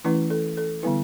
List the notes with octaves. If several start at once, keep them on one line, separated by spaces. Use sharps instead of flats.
E3 A3 C#4 E4 B4
A4
A4
D3 G3 B3 E4 B4